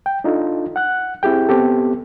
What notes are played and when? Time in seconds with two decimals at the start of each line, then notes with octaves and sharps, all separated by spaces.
0.06 G5
0.24 D4 D#4 F4 A4
0.76 F#5 F#6
1.23 C4 E4 G4 G#4 G5
1.49 B3 C4 G4 A4